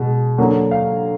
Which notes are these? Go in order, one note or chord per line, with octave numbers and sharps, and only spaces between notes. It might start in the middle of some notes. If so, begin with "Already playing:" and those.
Already playing: B2 G#3
D3 F#3 A#3
F5